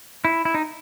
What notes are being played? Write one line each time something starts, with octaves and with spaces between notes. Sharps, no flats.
E4
E4
D#4